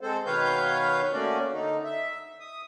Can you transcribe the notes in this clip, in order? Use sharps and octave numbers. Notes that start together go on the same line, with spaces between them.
G#3 C4 A4 C5
B2 D#3 B4 C#5 F5 G6
A3 A#3 C#4 F#4 D5
D3 D#4
E5
D#6